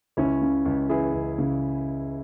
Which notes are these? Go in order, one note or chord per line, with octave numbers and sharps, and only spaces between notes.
C#2 C#4 E4
C#3
C#2
E3 E4 G#4
C#2
C#3